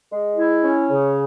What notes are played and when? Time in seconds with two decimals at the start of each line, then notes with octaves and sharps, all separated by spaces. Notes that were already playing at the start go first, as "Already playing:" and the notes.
0.11 G#3
0.37 E4
0.62 C#4
0.89 C#3